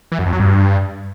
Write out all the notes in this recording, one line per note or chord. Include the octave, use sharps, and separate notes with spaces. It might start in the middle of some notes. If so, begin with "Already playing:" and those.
E3
F#2
F2
F#3
G2